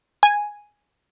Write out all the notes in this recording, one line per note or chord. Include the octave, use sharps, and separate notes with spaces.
G#5